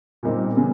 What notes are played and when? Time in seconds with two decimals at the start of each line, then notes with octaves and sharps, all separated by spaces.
0.23 A#2 G3 C4 D#4
0.57 C#3 E3